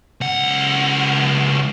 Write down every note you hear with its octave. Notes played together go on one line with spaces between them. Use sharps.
C#2 F#5